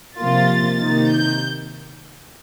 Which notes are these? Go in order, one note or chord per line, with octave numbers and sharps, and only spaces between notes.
C3 F3 A#3 F4 A6
C3 D#3 A#3 D#4
G6